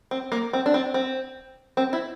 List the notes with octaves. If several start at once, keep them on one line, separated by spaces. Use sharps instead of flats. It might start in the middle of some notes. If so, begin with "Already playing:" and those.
C4
A#3
C4
D4
C4
C4
C4
E4